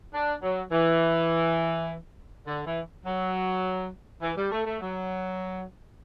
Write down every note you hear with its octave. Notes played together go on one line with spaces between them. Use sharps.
D4
F#3
E3
D3
E3
F#3
E3
G3
A3
A3
F#3